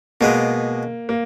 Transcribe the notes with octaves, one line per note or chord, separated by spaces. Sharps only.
B2 G#3 A#3 B3
A#3